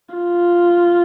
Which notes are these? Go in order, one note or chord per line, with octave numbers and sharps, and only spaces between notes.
F4